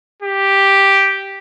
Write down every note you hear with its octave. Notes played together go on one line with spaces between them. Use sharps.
G4